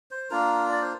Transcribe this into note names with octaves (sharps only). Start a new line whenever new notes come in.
C5
A#3 D4 F4 A#4
D5
C5